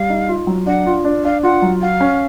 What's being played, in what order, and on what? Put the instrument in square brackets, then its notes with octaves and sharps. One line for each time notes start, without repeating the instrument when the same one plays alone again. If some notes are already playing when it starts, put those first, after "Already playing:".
Already playing: [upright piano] G3 [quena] F5
[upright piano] D#4
F4
F#3
[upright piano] D4 [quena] F#5
[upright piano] F4
D4
[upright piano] D4 [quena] F5
[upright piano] F4 [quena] F#5
[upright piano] F#3
[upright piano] F#4 [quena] F5
[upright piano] C#4